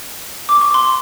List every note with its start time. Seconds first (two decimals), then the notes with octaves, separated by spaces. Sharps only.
0.49 D6
0.61 C#6
0.74 C6